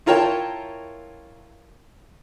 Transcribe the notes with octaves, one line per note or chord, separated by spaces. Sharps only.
E4 F4 A#4 C#5 G5 A5